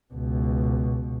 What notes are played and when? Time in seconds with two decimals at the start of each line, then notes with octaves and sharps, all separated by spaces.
0.14 C#2 B2